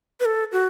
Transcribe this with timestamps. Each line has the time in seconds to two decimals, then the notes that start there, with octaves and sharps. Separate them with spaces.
0.20 B4
0.25 A4
0.52 F#4